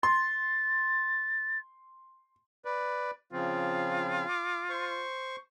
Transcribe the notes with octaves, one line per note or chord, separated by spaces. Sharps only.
C6 A6
B4 D5
C#3 F3 C4 F4
D6
C5 C#6